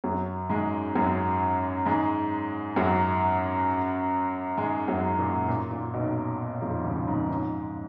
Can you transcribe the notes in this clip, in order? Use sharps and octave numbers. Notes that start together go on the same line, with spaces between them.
F#2 F#3
G#2 G#3
F#2 F#3
G#2 G#3
F#2 F#3
G#2 G#3
F#2 F#3
A#2
A#2
A#2
B1 B2
F2 F3
C#2 C#3
G#2
G#2